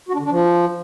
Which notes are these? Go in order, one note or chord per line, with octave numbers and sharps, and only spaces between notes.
F#4
D4
D3
D4
F3